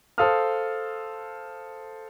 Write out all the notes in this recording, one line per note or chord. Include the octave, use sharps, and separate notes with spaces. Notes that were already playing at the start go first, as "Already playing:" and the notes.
A4 C5 F5 A5 D#6 F6